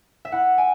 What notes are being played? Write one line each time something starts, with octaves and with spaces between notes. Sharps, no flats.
E5
E4 F#5
G#5